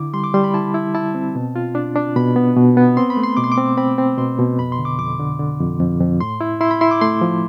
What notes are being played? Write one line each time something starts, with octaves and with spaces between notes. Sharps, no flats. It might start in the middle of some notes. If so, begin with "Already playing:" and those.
Already playing: D3 E4 D6
G3 C6
D6
G3 C6
B5
E4 A5
E4
E4 A5
C4
B2
F4
D4
D4
B2 B5
B3
B2
B3
C4 C6
B5
A3
C6
B2 D6
C6
D6
C4
C4 B5
C4
B2 C6
B2
F2 B5
C6
D3
D6
F2 D6
D3
D3
F2
F2
F2
A2 C6
E4
E4 C6
B5
E4 C6
D6
A3 C6
F3